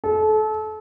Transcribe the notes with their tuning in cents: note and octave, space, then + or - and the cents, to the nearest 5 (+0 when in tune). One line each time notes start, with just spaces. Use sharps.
A4 -30